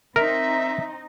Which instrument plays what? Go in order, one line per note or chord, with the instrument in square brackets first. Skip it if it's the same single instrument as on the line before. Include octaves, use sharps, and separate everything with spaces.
[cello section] C4 D#4 [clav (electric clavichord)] A#4 [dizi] E5